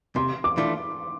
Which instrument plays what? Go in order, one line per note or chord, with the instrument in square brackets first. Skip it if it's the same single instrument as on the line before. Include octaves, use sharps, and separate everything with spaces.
[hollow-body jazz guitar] C3 [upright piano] C6
[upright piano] D6
[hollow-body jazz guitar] E3 A3 D4 F4